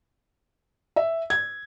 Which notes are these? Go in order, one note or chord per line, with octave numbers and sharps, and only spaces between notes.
E5
G#6